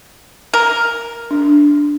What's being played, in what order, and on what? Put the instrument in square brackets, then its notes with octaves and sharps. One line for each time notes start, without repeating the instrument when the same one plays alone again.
[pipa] A#4
[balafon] D4